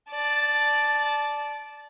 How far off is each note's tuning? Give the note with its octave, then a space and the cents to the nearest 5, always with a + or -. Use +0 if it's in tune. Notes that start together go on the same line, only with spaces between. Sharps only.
D5 +0 A5 -15